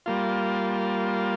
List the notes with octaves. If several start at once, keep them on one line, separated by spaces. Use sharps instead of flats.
G3 A#3 F4